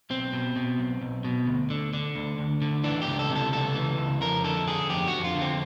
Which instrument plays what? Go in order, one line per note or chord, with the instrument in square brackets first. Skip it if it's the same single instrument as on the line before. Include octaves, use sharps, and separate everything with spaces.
[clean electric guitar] B1 C4
B2
B2
B1
B1
B2
D2
D3
D3
D2
D2
D3
E3 D4
G4
C#2
A4
C3
A4
C#2 A4
E3
C#2
F2 A#4
D3 A4
D3 G#4
F2 G4
F2 F#4
F4
D3
C4